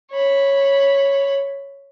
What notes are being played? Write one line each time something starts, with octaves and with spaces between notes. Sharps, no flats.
C#5 B5